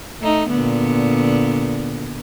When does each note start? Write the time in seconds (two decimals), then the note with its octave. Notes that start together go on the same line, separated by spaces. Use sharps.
0.20 A3 D#4
0.50 A#2 D3 B3